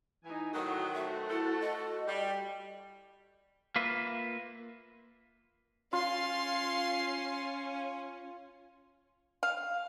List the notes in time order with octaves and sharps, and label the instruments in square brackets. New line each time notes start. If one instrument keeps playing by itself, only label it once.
[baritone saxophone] E3 [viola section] D#4 G#5
[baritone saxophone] A2 [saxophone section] D#3 F#3 [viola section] F#4 C5 F#5 [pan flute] D#6
[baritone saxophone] A3 [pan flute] E5
[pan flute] E4 [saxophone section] A4
[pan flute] D#5
[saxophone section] G3
[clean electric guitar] A#3 F4 B4 E5
[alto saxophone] C#4 [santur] F4 [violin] F5 C6
[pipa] F5